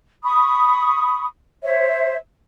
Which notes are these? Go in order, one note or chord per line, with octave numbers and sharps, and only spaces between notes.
B5 C#6 D#6
C5 C#5 E5